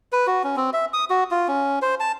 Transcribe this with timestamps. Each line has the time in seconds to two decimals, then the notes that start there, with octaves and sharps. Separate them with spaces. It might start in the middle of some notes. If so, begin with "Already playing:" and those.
0.12 B4
0.27 F#4
0.43 C#4
0.56 C4
0.73 E5
0.93 D#6
1.10 F#4
1.31 F4
1.48 C#4
1.82 C5
2.00 A5